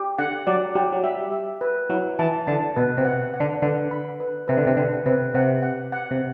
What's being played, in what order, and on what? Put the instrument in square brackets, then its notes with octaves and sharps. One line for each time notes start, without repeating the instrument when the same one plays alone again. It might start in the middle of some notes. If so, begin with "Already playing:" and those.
Already playing: [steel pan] G4
[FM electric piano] D3 [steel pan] F#5
[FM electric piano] F#3 [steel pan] D5
[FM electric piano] F#3 [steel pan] G4
[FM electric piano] F#3
[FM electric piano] G3 [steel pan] E5
[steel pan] E5
B4
[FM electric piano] F#3 [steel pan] E4
[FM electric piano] E3 [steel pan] A5
[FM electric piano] D3 [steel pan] A5
[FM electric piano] B2 [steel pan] B4
[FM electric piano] C3
[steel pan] F#5
F#5
[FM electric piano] D3
[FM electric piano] D3 [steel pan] B4
[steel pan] B5
B4
[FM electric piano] C3 [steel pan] B4
[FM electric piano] D3
C3
[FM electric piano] D3 [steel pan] B4
[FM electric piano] C3 [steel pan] B4
[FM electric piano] C3 [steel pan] F#5
[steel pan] F#5
F#5
[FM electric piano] C3